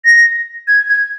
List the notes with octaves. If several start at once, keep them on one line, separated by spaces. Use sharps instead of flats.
A#6
G#6
G#6